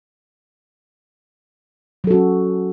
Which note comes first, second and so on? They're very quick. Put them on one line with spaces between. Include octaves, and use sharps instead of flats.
F#3 A4 F#4 C#4